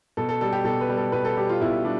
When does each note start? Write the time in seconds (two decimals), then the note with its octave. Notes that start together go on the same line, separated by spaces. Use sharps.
0.17 B2 A4
0.29 A4
0.41 G3 A4
0.53 G4
0.64 B2 A4
0.81 B4
0.89 G3
0.97 A4
1.12 B2 B4
1.25 A4
1.37 G3 G4
1.49 F4
1.61 B2 E4
1.85 G3 D4